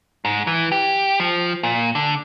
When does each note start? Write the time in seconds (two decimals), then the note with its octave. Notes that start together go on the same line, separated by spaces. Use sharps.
0.25 G#2
0.47 E3
0.72 G4
1.20 F3
1.63 A#2
1.95 D3